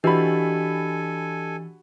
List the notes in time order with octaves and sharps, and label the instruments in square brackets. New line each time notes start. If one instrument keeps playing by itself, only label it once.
[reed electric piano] E3 [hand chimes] D4 G4 D#5 [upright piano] F#4 B5 [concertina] A4 G#5